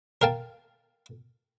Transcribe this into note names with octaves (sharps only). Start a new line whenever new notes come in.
A#4 F5 G5 A5